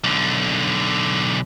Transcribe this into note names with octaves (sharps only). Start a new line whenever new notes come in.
B1 D3